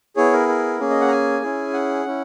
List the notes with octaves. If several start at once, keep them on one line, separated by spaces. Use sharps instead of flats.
B3 E4 G#4 C#5
A#4
A#4
A#3 C#4 G#4
D#5
F#5
A#5
G#5
C#4 E4 G#4
F#5
C#4 E4